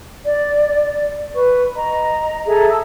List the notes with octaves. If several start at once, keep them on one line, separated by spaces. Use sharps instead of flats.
D5
B4 C#6
D#5 A#5
G#4 A4 E5 A#5
A5 E6